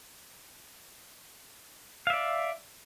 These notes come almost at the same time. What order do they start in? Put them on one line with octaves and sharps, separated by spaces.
F5 E5 D5